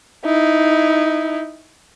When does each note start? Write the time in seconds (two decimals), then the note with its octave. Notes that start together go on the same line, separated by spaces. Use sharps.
0.25 D#4 E4